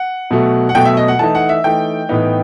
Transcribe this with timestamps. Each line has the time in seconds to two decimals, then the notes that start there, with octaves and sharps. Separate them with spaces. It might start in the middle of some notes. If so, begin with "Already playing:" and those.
Already playing: F#5
0.31 B2 F#3 A3
0.69 F#5
0.75 B2 F#3 A3 G5
0.85 E5
0.97 D#5
1.08 F#5
1.19 E3 A3 D#4 A5
1.35 F#5
1.49 E5
1.64 E3 A3 D#4 G5
2.09 A2 E3 B3 D#4